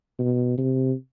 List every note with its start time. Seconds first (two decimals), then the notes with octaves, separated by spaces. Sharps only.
0.19 B2
0.58 C3